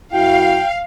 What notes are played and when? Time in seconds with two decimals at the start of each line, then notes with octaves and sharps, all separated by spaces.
0.13 F#2 E4 F#4 F5 G5